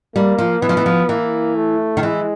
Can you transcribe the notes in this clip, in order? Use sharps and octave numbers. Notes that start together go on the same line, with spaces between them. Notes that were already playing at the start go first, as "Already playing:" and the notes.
G3 A#3
F3
E3 B3
F3
E3
F3
E3 A#3
A3
D#3
E3 G#3